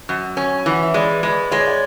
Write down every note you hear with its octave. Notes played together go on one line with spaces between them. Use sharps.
F#2
C#4
G#5
E3 F#5
E5
G#3 B4 D5
G#3 B4 D5
G#3 C#5
D5
C#5